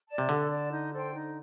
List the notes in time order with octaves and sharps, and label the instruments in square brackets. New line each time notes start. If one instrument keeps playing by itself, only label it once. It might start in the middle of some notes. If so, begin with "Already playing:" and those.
[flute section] D5 A5
[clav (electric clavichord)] C3
[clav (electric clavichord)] D3 [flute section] A4
[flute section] D5 A5
D#4
A4 C5 G5
D#4